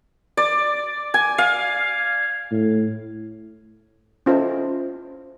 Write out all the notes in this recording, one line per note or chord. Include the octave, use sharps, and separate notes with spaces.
D5
G#5
F5
A2
C#4 E4 F4 A4 C5 D#5